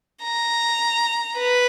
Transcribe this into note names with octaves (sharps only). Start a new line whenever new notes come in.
A#5
B4